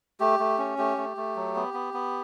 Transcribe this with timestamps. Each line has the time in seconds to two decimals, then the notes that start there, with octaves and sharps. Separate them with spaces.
0.20 A3 G4
0.39 A3
0.58 C#4
0.78 A3 G4
0.97 A3
1.17 A3
1.36 F#3
1.55 B3
1.74 B3
1.94 B3